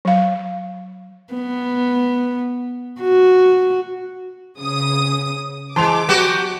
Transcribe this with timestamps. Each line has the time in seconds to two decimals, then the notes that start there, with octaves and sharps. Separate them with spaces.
0.05 F#3 F5
1.34 B3
3.01 F#4
4.59 C#3 D#6
5.76 E3 G#3 A5 C6 D6 F7
6.09 F#3 B3 F#4 G4